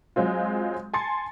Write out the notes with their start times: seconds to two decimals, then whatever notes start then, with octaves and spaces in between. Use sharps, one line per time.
0.16 F#3 G#3 C4 F4
0.94 G#5 A5 C6 A6 C#7